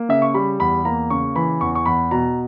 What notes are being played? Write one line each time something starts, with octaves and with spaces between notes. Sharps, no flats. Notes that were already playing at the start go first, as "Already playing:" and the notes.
Already playing: A#3
C#3 E5
C#6
G3 B5
E2 B5
A#3 A#5
C#3 C#6
E3 B5
E2 C#6
C#6
E2 B5
B2 A#5